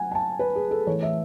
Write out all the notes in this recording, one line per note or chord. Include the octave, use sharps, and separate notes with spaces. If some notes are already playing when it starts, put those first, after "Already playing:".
Already playing: F#3 F#5 G#5
G#5
A5
B4
G#4
A4
A2 E3 A3 C#5
E5